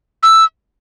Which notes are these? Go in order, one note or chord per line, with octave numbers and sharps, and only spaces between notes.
E6